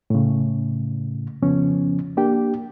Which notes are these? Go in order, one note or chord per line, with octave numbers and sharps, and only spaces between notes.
A2 C#3
F2 C#3 F3 B3 C#4
A#3 D4 G4 G5